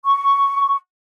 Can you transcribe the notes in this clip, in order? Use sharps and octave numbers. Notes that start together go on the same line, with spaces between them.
C#6